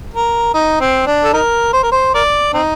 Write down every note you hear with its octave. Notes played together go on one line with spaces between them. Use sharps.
A#4
D#4
C4
D4
A4
D#4 A#4
C5
A#4
C5
A#4 D5
C4 D#4